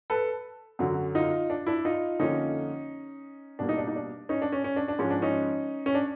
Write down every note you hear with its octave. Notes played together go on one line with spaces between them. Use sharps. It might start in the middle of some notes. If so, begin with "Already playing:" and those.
A4 B4
F#2 D3 F#3
D#4 F4
D4
D4 E4
D#4 F4
F2 D3 F3 A#3 C#4 D#4
B2 G3 A#3 D4
D#4
D4
D#4
D4
C#4 D#4
D4
C#4
C#4
D4
D4
G#2 F3 G#3 C#4
D4
C#4 D#4
C#4
D4